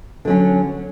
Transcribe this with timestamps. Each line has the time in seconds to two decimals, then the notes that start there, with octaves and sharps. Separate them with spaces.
0.25 D3
0.27 F#3
0.30 C#4